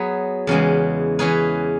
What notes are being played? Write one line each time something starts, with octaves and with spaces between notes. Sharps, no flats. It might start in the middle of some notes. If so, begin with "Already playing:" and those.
Already playing: F#3 B3 G#4 B4
E2 C#3 E3 G#3
E3 C#4 G#4 B4